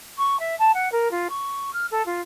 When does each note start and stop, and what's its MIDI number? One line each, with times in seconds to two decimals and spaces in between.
0.18 0.39 85
0.40 0.55 76
0.59 0.72 81
0.74 0.91 78
0.92 1.11 70
1.11 1.28 65
1.30 1.71 85
1.73 1.86 89
1.91 2.05 69
2.06 2.21 65